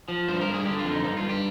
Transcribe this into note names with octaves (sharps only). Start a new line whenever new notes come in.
F3
G2 C5
A#4
G2
G#4
D3 G4
F4
F2
D#4
G2 D#4
F4
G2
G4